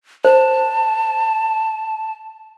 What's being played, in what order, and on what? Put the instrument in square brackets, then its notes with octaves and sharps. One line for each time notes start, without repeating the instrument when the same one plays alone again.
[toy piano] C5 [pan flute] A5